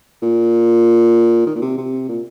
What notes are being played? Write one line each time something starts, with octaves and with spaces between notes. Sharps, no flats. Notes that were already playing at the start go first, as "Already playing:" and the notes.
A#2
D#3
A#2
C3
C3
A#2